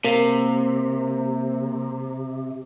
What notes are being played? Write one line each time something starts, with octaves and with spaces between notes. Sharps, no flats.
C3 A#3